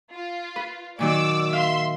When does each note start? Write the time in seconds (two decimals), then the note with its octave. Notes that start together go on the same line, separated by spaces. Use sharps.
0.13 F4
0.56 B4
0.99 A#2 D#3 F#3 D5 D6 E6
1.53 E5 F5 C6